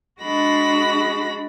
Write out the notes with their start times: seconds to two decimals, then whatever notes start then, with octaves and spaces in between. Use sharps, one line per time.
0.21 G#3 D4 F#4 B5 A#6